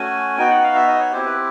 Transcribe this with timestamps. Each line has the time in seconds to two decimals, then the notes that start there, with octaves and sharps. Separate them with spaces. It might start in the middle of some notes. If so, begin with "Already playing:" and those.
Already playing: A3 C#4 F#4 G#5
0.38 B3 D#4 F#4 G5
0.51 F#5
0.63 F5
0.75 E5
0.87 D#5
1.00 C#5
1.12 C4 E4 G4 C5
1.24 B4